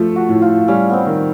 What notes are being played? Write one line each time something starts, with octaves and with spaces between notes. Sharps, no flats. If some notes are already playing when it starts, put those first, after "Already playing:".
Already playing: F3 A3
F#4
A2
F4
G3 C#4
B3 C4
D#3